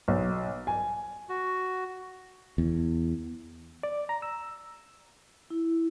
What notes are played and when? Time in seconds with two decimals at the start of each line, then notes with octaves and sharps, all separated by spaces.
0.08 B1
0.67 G#5
1.29 F#4
2.58 E2
3.83 D5
4.09 A#5
4.22 E6
5.50 E4